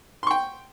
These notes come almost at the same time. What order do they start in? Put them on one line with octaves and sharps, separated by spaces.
C6 C#6 G5